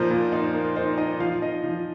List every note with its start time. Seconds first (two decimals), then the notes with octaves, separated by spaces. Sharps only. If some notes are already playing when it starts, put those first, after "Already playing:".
Already playing: A#2 F3 D#4 A#4 C5
0.11 A#2
0.32 D#4
0.54 A#3
0.76 D#4 C5
0.98 D#4 D#5
1.20 F3 F5
1.42 D#4 D#5
1.64 F3